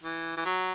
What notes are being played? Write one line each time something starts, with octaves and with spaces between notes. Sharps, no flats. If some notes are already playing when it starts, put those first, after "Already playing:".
E3
E3
F#3